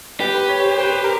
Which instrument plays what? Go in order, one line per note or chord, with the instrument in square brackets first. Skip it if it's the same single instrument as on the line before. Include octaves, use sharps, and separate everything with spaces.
[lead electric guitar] G4 [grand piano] B4
[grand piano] B4
C#5
C5
C5
B4
A#4